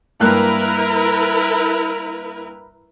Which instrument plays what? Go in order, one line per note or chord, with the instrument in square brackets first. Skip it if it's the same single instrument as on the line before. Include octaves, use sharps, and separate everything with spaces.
[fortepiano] G2 A#3 F#6 [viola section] E4 A#4 B4